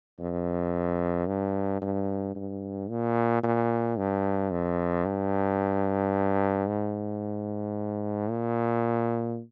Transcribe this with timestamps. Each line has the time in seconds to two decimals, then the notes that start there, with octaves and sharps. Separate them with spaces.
0.20 F2
1.27 G2
1.82 G2
2.36 G2
2.90 A#2
3.43 A#2
3.97 G2
4.51 F2
5.05 G2
6.67 G#2
8.30 A#2